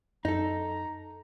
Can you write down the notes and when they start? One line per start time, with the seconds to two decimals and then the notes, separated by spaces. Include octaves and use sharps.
0.25 F#2 D#4 A4 A#5